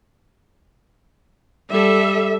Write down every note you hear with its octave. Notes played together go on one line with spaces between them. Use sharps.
G3 A4 E5